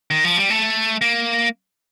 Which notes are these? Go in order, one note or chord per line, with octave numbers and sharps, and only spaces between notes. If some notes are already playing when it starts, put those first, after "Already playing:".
D#3
F3
G3
A3
A#3